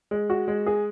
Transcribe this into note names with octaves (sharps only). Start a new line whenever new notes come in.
G#3
F#4
G#3
G#4